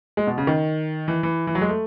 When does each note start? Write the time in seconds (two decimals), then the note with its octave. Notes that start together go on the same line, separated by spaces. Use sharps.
0.17 G#3
0.27 B2
0.38 C#3
0.47 D#3
1.08 E3
1.23 E3
1.47 E3
1.55 F#3
1.61 G#3
1.69 A3